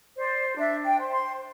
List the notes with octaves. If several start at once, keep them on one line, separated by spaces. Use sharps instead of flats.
C5 D5
D4 E5
G5
C5
C6